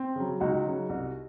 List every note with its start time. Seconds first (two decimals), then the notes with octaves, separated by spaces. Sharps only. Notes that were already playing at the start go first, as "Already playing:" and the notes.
Already playing: C4
0.16 C#3 F#3
0.40 C#2 D#4 F#4
0.65 C#3 F#3
0.89 C2